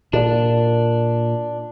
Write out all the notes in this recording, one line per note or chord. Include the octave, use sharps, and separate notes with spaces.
A#2 D4